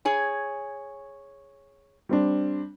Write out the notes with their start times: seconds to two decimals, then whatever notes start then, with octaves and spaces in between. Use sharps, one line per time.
0.05 G#4 C#5 G#5
2.09 G3 C4 D4